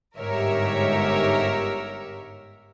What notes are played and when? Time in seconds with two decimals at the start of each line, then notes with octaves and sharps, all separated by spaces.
0.18 G1 G#2 G4 A#4 C#5 E5